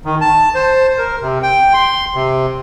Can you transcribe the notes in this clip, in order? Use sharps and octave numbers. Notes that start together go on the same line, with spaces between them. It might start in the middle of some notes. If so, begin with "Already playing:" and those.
D#3
A5
C5
A#4
C3
G5
C6
C3